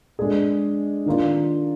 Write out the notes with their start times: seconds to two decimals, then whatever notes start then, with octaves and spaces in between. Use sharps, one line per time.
0.19 G#3 D4 G#4
1.06 D#3 A#3 D4 F4